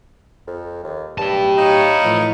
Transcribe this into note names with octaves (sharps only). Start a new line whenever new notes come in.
F2
D#2
B1 G2 E4 G4 A5
D#4 C#5 F5
A2 E3 F3